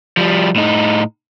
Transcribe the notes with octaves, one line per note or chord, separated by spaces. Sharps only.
F3 G3
A2 D#4